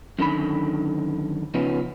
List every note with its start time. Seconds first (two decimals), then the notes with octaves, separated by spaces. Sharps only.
0.19 F#2 D3 D#3 B5
1.54 C#3 F3 B3 C#4 D#4